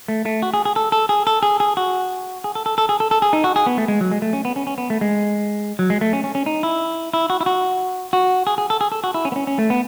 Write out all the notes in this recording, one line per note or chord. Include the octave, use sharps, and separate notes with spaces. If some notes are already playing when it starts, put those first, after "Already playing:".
A3
A3
F#4
G#4
G#4
A4
A4
G#4
A4
G#4
G#4
F#4
G#4
A4
A4
A4
G#4
A4
A4
G#4
D#4
F#4
G#4
B3
A3
G#3
F#3
G#3
A3
C#4
B3
C#4
C#4
B3
A3
G#3
F#3
G#3
A3
C#4
C#4
C#4
D#4
E4
E4
F#4
E4
F#4
F#4
G#4
G#4
A4
G#4
A4
F#4
E4
C#4
B3
C#4
C#4
A3
B3